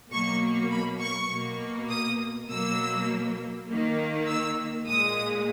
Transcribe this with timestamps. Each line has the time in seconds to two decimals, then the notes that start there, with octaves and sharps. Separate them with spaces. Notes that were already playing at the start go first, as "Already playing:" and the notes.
0.11 B2 F#3 A#3 C#6
0.71 B5
1.01 C#6
1.30 B2 A#3
1.90 D#6
2.49 B2 F#3 A#3 E6
3.69 D#3 A#3
4.28 E6
4.88 A#2 G#3 D#6